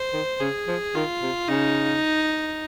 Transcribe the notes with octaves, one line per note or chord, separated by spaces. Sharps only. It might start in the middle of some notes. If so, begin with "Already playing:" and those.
Already playing: C5
D#3
C#3 G#4
F3
D#3 F4
C3
C#3 D#4